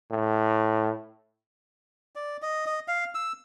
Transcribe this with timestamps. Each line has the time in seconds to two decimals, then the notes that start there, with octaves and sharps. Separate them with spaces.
0.11 A2
2.16 D5
2.42 D#5
2.66 D#5
2.88 F5
3.15 E6